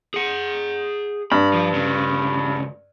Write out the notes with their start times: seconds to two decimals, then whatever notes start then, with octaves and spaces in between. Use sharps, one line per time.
0.14 G#4 F#5
1.32 G2 B5
1.54 F3
1.74 D2 C#3